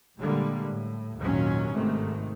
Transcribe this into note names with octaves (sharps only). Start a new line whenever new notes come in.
A#2 D3 G3 G#3 A#3
A2
G#1 D#2 A#2 D#3 F#3 C#4
G#1 G#2 C3 D#3 A3